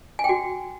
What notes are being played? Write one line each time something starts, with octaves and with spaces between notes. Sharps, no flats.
G#5
G5
F#4